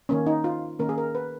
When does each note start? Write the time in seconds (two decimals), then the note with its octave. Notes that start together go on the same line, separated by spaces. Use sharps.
0.09 D#3 A#3 C#4
0.27 D#4
0.44 F4
0.79 D#3 A#3 C#4 A#4
0.89 G#4
0.98 A#4
1.15 B4